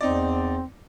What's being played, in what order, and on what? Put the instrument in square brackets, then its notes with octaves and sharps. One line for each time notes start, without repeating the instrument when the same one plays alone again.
[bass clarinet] E2 [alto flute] C4 [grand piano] D#4 D5